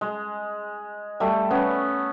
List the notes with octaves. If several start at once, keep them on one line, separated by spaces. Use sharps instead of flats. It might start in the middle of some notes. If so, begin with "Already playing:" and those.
G#3
G3 A3
B3 C#4